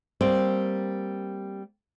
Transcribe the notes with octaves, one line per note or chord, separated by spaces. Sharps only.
G3 A#3 C4